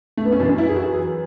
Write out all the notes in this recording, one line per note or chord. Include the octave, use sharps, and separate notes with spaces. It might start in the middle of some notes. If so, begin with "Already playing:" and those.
A3
B3
C#4
F#2 E3 D4
E4
G#4
F#4
G#4